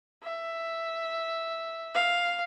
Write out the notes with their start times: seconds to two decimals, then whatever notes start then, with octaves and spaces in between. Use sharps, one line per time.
0.24 E5
1.95 F5